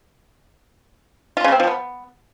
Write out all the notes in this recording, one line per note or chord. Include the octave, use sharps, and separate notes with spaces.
F4
C#3
C4
F3
B3